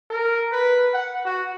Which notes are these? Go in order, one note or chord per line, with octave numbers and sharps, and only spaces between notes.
A#4
B4
F#5
F#4